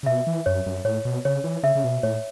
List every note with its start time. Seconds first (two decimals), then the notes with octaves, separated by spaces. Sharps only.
0.03 C#3
0.06 B2 E5
0.27 E3
0.46 F#2 C#5
0.66 F#2
0.85 A2 C#5
1.05 B2
1.25 C#3 C#5
1.44 E3
1.63 C#3 E5
1.75 C#3
1.84 B2
2.03 A2 C#5